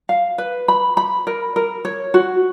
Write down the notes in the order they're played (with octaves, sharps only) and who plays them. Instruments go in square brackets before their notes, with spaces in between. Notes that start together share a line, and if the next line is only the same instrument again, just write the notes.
[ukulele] F5
B4
B5
B5
A#4
A#4
C#5
F#4